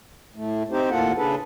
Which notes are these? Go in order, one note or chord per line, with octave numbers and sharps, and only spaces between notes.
A2 A3
C4 D#4 G4 C5
D#2 A2 A#3 F4 A4 F#5
C#3 D4 G#4 A4 B4